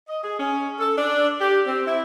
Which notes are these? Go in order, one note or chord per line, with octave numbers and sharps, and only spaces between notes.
D#5
G#4
C#4
A4
D4
G4
C4
E4